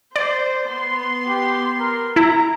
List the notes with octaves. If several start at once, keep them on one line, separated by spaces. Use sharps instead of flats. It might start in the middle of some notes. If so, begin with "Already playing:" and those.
C5 D5
B3 C6
G4
A#4
E4 A#5